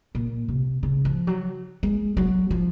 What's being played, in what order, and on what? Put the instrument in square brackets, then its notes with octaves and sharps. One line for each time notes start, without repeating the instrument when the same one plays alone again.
[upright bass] A#2
C3
C#3
F3
F#3
G#3
F#3
F3